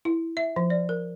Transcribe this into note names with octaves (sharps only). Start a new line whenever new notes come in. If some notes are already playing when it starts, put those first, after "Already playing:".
E4
E5
F3
D5
A#4